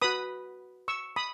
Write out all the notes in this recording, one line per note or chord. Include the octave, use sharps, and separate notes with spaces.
F#4 B4 B5 D#6
C#6 E6
B5 D#6